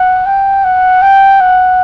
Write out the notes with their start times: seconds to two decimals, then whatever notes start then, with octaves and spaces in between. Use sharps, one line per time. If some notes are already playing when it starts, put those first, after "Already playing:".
Already playing: F#5
0.26 G5
0.64 F#5
1.02 G5
1.41 F#5